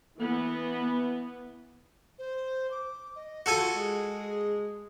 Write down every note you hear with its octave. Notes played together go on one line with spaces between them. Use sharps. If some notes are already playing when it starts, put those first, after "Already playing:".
E3 B3
C5
D6
D#5
F4 F#4 A4 G#5
G#3 G#4